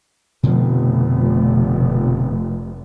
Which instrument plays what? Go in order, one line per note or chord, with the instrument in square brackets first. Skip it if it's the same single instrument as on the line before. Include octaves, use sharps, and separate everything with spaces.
[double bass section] F1 [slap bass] B2 D3 F3